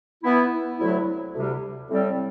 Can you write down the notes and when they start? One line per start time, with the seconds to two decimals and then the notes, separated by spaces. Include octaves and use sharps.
0.24 E3 B3 E4
0.79 D2 C3 F#3 A3 E4
1.35 D2 C3 G3
1.90 A2 G3 C4